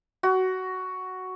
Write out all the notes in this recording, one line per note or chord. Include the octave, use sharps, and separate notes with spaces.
F#4